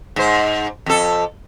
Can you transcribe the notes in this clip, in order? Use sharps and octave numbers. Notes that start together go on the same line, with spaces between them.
G#2 C5
F2 A4